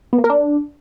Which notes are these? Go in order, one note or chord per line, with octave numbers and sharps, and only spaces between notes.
B3
A#3
A#4
D4